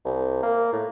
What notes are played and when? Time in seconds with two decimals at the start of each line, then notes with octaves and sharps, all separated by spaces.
0.05 C2
0.43 A#3
0.72 A2